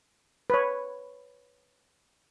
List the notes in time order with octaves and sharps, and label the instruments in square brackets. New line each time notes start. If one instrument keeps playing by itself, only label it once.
[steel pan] B4 C#5